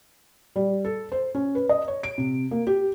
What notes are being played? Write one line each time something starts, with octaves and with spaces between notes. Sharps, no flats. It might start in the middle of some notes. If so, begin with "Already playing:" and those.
G3
A4
C5
C#4
B4
D#5
C#5
D7
C3
A#3
G4